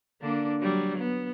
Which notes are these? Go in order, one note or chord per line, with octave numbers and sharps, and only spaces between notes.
D3 A#3 D4
F#3 G3
B3